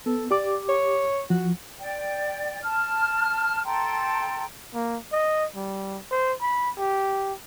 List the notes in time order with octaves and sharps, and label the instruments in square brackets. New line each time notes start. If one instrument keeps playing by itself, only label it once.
[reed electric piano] B3 [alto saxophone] A4
[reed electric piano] G4 D6 [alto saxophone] D5
[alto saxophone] C#5
[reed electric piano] F3 [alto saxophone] F#4
[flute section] D5 G5
A5 F6
A4 G5 A#5 C6
[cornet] A#3
D#5
G3
C5
B5
G4